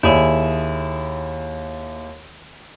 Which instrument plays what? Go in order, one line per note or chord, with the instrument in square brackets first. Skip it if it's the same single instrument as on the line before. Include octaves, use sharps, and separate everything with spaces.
[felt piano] D#2 [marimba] D#3 D5 [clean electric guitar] E4 G#4